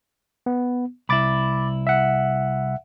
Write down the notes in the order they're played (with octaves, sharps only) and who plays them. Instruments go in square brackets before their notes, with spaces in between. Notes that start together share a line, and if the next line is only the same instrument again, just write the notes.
[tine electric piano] B3
[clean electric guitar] C2 E4 [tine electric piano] B5 D6 A6
[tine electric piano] E5 F#5